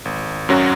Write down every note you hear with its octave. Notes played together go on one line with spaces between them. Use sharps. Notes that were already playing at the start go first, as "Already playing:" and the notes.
G#1
F#2 F#3 C#4 F#4